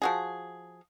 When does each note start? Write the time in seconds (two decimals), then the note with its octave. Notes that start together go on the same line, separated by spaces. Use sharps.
0.02 F3 F#4 G#4